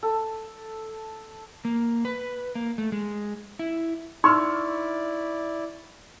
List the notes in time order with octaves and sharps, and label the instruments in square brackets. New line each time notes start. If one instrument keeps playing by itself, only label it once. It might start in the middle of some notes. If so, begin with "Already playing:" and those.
[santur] A4
[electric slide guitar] A#3
B4
A#3
A3
G#3
E4
[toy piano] D#4 C6 [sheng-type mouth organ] E4 D5 [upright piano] C#6 E6 F6